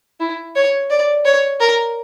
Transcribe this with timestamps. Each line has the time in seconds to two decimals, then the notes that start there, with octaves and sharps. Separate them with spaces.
0.20 E4
0.55 C#5
0.90 D5
1.25 C#5
1.60 A#4